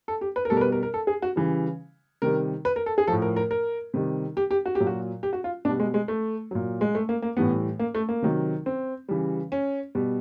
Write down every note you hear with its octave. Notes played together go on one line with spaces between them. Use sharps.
A4
G4
B4
A#4
B2 G3 A4
A#4
B4
A#4
A#4
A4
G#4
F#4
C#3 E3 G3
C3 D#3 G3 A#4
B4
A#4
A4
G#4
A2 F3 A4
A#4
A#4
A#4
C3 D#3 G3
G4
G4
F#4
G4
A#2 F#3
F#4
G4
F#4
F4
B2 D4
G3
G#3
G#3
A3
A#2 F#3
G#3
A3
A#3
A#3
A2 E3 G3 B3
A#3
A3
A#3
C3 D#3 F#3
C4
C#3 E3 G3
C#4
B2 G3